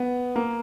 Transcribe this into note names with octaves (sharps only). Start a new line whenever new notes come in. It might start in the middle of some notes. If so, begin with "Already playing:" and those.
Already playing: B3
A#3